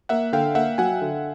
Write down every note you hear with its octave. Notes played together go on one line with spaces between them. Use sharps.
A#3 E5 F#5
D3 F5 G5
A#3 E5 F#5
F#3 F#5 G#5
D3